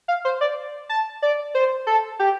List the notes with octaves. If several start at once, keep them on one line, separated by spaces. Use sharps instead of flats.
F5
C5
D5
A5
D5
C5
A4
G4